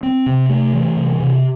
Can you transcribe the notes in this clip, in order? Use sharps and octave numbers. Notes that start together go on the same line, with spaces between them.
C4
C3
A3
E3
C3
C3